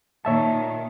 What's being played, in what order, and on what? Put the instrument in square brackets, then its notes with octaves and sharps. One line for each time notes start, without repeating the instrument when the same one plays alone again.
[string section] A#2 D#3 [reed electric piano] C#5 E5 A5